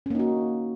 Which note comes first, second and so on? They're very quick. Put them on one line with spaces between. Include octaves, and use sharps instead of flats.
C#4 A#3 D#4 F#4